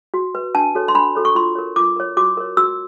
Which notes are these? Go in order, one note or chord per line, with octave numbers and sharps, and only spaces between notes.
F#4
B4
D4 A5
F#4 A4 C#5
C6
D4 B5
F#4 A4 C#5
C#6
F4 C6
A#4 C#5
F4 D6
A#4 C#5
F#4 D6
A#4 C#5
F#4 E6